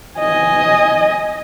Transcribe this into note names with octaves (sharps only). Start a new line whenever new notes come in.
D#5 G#5